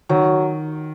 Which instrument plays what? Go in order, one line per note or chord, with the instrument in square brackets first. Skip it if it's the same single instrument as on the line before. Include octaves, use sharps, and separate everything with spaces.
[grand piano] D#3 [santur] F#3